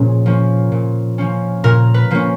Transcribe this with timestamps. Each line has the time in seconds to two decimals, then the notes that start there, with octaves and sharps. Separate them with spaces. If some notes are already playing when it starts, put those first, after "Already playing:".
Already playing: A#2 F3 C#4 G#4
0.26 F3 A#3 C#4
0.72 A#2
1.18 F3 A#3 C#4
1.64 A#2 A#4
1.94 B4
2.11 F3 A#3 C#4